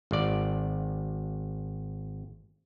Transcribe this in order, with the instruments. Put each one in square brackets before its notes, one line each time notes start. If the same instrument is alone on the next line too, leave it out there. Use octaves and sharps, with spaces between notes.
[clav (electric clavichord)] G#1 D5